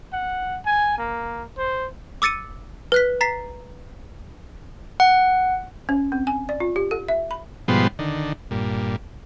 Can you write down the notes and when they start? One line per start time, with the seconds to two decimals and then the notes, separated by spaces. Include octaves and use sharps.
0.13 F#5
0.66 G#5
0.98 A#3
1.58 C5
2.22 D6 E6 A6 C#7 D#7
2.92 B4 F#6 B6
3.21 A#5 A6 B6 C7
5.00 F#5
5.89 C#4
6.12 C4
6.27 G#5
6.49 D5
6.60 F4
6.76 G4
6.91 A4
7.08 E5
7.31 B5
7.68 G#2 B2 F3 G3 B3 C5
7.99 D3 D#3
8.51 G2 A#2